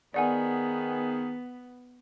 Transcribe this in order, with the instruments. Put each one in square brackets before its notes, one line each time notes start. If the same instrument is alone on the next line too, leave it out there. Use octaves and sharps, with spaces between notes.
[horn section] D#3 G#4 [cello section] B3 [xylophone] D5 F#5 G#5